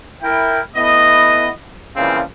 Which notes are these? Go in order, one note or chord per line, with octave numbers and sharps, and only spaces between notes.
E4 A#4 G5
A3 B3 E4 D#5
A#2 C#3 E3 F3 G3 C4